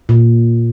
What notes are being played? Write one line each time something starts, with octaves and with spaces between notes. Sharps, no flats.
A#2